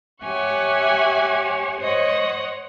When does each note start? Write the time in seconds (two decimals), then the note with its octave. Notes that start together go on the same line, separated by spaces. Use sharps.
0.22 G4 C#5 E5 F#5 G#5 C#6
1.80 C5 C#5 D#5 F#5